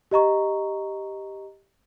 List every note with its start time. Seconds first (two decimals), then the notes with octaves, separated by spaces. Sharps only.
0.11 G4 D#5 A#5 C#6